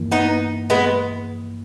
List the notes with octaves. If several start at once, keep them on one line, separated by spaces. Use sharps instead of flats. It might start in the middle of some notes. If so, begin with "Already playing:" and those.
Already playing: G2 E3 A#3
B3 D#4
G#3 B3